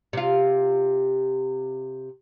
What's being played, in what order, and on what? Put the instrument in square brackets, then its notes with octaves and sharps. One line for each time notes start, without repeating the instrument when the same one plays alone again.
[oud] C3 F4